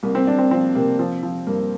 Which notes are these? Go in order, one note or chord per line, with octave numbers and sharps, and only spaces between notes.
C2 A#3
C4
C2 D4
C4
F3 C4
C3 A#3
F3 C4
F3
G2 A#3